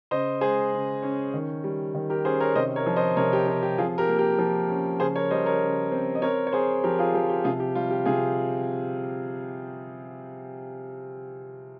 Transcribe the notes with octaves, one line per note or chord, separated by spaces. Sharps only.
C#3 C5 D#5
G#3 G#4 C5
C#3
C#4
D#3
G3
D#3
G4 A#4
C#4 G#4 C5
A#4 C#5
C3 C5 D#5
A#4 C#5
F3
C5 D#5
C3 A#4 C#5
G4
C4 G4
G4
F3 F4 G#4
G4 A#4
A#3
G4 A#4
F3
C#4
C#3 G#4 C5
A#4 C#5
G3 C5 D#5
A#4 C#5
C#3
C4
D#5
C4 A#4 C#5
C#5
C4 G#4 C5
F3 G4 A#4
F4 G#4
F3 G4
G4
C3 F4 G#4
G4
G3 F4
G4
C3 F4 G#4